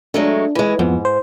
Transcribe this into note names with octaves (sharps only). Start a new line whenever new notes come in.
F#3 G#3 A3 D4
E3 G#3
F2 G#2 F3 B3
C5